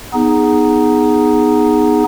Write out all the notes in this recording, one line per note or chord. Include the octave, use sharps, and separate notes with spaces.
B3 D#4 G#4